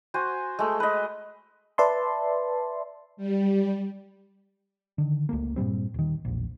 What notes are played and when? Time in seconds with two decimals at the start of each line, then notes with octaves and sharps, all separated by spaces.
0.14 F#4 C5 G#5
0.59 G#3 A3
0.80 B4 D#5
1.78 B4 D5 E5 A5 C6
3.17 G3
4.98 D3 D#3
5.29 C#2 A3 A#3
5.56 G2 A#2 G3 C4
5.94 D#1 D#3
6.25 E1 A#1